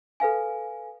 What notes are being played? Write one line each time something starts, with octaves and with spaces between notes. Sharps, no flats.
A4 B4 F5 G#5